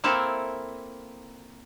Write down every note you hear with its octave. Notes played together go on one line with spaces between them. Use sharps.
A#3 C4 E4 A4 A#4